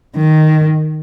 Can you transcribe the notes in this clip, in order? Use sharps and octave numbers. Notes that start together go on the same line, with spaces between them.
D#3